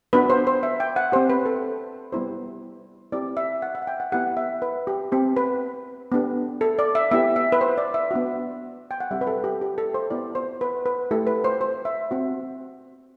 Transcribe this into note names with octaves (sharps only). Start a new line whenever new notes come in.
B3 D4 F#4 B4
C5
C5
E5
G5
F#5
C4 G4 C5
B4
A4
G3 B3 E4 G4 C5
C4 E4 G4 D5
E5
F#5
E5
F#5
G5
F#5
B3 E4 G4 F#5
E5
B4
G4
C4 G4
B4
B3 D4 G4
A4
D5
E5
B3 E4 G4 E5
E5
B4
C5
D5
E5
B3 D4 F#4
G5
F#5
G3 C4 G4 E5
B4
A4
G4
G4
A4
C5
B3 E4 G4 D5
C5
B4
B4
A3 E4 G4 A4
B4
C5
C5
E5
C4 F#4